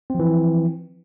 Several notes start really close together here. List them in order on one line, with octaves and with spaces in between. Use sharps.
C4 F3 E3